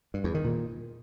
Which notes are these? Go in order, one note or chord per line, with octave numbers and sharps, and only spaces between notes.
G2
E2
D#3
A#2